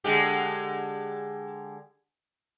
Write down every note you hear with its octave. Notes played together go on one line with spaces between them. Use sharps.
D3 G#3 G4